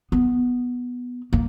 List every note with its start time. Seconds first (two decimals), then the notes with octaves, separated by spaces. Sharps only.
0.12 B3
1.33 A#3